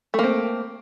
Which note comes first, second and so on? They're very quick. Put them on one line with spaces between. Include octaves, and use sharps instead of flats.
A3 A#3 C4